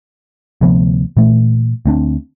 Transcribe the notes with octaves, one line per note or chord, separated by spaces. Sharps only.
D2 C3 F3 B3
A#2 E3 A3
D2 C4 D4